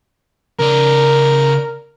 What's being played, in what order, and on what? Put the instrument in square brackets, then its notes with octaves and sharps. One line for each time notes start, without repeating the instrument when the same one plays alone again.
[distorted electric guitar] C#3 D5 [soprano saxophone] A#4